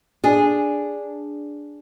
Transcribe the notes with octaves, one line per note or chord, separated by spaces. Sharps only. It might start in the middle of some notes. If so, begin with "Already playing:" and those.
D4 G#4